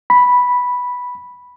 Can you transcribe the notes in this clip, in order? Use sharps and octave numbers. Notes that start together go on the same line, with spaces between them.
B5